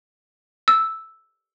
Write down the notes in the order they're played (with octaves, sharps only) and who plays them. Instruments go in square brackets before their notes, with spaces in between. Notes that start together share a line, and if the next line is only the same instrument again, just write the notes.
[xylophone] E6